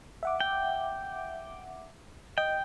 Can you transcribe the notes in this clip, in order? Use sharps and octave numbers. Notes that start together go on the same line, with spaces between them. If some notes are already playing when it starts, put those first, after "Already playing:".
E5 F#5 D6
G5
D#5 G5